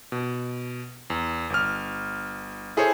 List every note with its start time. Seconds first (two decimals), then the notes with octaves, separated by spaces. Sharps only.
0.12 B2
1.10 E2
1.50 G1 F6
2.77 E4 G#4 A4 C5 C#5